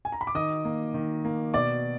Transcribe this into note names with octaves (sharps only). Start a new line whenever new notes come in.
G#5
A#5
B5
D6
D#3 D#5 D#6
A#3
D#3
A#3
B2 D5 D6